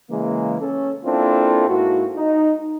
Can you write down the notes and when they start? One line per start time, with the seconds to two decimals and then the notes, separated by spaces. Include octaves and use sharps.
0.10 C#3 E3 G#3 A#3
0.61 C#4 A4
1.05 A#3 C4 D4 E4 F4 A4
1.69 G#2 A#3 E4 F#4
2.16 D#4